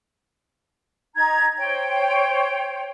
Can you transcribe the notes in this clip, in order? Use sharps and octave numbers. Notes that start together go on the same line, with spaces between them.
D#4 A#5 G#6
C5 C#5 G5